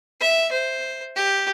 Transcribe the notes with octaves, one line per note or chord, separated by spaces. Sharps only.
E5
C5
G4